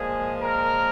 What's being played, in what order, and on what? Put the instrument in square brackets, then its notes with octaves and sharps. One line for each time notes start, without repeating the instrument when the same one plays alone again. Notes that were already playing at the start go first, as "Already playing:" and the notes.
Already playing: [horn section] A#2 F3 G#3 G#4
A#4